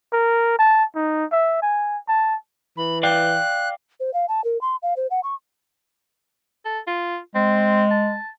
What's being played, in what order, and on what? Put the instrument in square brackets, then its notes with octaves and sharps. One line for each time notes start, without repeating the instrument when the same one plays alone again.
[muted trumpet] A#4
A5
D#4
E5
G#5
A5
[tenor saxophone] E3 [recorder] B5
[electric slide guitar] D5 F5 G5 [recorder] F#6
[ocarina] C5
F5
A5
A#4
C6
F5
C5
F#5
C#6
[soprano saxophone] A4
F4
[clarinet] G#3 [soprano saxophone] C4
[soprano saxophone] A5